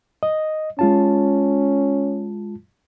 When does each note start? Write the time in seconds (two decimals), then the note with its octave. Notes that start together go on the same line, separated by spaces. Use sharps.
0.23 D#5
0.79 G#3 C#4 F4 A5